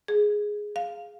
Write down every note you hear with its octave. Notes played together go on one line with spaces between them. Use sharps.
G#4
F5